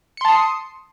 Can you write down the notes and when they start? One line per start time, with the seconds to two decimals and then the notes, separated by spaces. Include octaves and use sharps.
0.17 C#7
0.21 C6
0.25 A5
0.28 D#6
0.32 C7